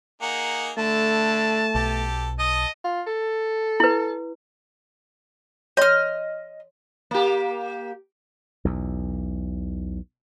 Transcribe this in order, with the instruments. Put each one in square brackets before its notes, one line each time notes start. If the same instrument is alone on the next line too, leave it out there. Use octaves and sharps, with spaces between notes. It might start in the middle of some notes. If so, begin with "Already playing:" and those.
[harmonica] A#3 D#4 G#4 [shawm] F#5
[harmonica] D3 [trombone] A3 [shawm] A5
[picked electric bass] B1 [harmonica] G4 A4
[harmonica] A4 A5 D#6 [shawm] D#5
[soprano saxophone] F4
A4
[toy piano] E4 B4
[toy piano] C#5 C6 [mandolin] D#5 F6
[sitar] A#3 G4
[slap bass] B1 E2